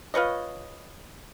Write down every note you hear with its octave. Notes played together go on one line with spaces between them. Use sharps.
F4 B4 C#5 D#5